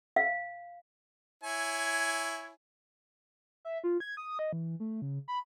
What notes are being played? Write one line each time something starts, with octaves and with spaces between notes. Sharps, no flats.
F5
E4 C#5 G#5
E5
F4
G#6
D#6
D#5
E3
A3
C#3
B5